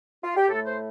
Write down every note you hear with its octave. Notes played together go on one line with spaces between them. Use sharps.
F4
G4
A2 A3 A4
C5